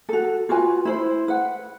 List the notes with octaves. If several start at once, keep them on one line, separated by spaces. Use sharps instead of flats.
F#4 A4
F4 F#4 B4 G#5
E4 C5
B4 F#5